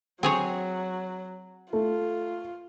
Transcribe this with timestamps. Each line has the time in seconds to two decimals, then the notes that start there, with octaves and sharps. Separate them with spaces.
0.23 F#3 C4 G#4 C#5
1.73 A3 F4